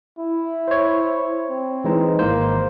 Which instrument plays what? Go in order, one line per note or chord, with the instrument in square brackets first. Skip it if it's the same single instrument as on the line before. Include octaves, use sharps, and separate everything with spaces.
[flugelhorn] E4
[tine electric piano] C5 C#5
[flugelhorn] C4
[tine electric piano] E3 G#3 D#4
[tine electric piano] G#1 C5 [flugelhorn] A#3